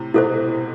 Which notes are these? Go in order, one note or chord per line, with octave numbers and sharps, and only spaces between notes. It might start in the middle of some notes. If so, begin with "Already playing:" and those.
Already playing: A2 C3
G#2 B2 E4 A4 C5